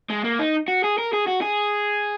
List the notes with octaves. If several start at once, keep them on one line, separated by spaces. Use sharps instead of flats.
G#3
A#3
D#4
F#4
G#4
A#4
G#4
F#4
G#4